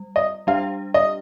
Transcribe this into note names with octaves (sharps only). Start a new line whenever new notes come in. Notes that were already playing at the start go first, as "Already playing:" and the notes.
Already playing: G3
D#5
G3 D4 G4 F5
D#5